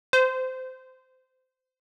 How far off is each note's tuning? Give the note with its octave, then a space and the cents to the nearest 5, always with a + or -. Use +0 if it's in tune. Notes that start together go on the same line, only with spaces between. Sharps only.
C5 -20